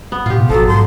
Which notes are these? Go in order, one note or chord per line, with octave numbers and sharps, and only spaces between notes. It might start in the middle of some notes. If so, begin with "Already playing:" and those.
B3
A2 F4 G4
B2
G#1 F3 F#3 A4
G#2 C6